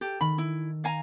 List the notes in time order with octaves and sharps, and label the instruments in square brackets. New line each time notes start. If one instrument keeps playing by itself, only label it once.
[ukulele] G4 [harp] A4
[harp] D#3 [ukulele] B5
[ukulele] E4
F5 G#5 A#5